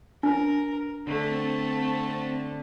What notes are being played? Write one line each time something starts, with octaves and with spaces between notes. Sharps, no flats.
D4 A#4
D3 A3 C4 A5